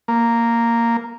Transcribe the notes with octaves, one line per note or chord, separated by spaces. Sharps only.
A#3